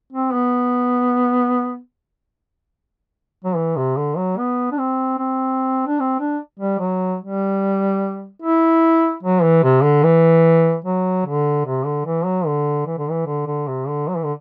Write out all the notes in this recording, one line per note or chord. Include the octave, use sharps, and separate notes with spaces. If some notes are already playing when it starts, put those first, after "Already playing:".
C4
B3
F#3
E3
C3
D3
F#3
B3
D4
C4
C4
D4
C4
D4
G3
F#3
G3
E4
F#3
E3
C3
D3
E3
F#3
D3
C3
D3
E3
F#3
D3
E3
D3
E3
D3
D3
C3
D3
F#3
E3
D3